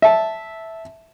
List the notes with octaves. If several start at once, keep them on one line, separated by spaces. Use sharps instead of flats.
E5 A5